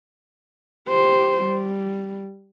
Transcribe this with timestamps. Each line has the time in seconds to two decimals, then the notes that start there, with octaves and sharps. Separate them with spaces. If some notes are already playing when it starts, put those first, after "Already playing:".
0.88 G4 C5
1.43 G3